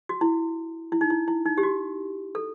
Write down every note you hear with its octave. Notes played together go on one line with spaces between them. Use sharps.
F#4
E4
E4
D#4
E4
E4
D#4
G4
F#4
A4